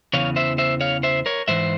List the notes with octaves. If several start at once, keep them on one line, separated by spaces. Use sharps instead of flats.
E2 C#3 E3 C#5 F5
C5 E5
C5 E5
C#5 F5
C5 E5
A#4 C#5
G#2 E3 C5 E5